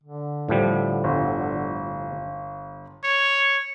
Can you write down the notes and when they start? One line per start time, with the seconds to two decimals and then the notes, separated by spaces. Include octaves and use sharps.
0.04 D3
0.49 A2 F3 G3
1.04 G1
3.04 C#5